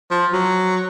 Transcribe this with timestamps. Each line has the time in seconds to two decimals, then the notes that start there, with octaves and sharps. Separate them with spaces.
0.11 F3
0.33 F#3